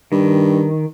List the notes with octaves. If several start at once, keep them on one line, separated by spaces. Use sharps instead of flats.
G2 D#3